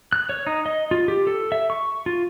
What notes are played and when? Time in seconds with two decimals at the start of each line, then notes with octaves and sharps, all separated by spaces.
0.13 F#6
0.29 C#5
0.47 D#4
0.66 D#5
0.91 F4
1.08 G4
1.27 A4
1.52 E5
1.70 C#6
2.06 F4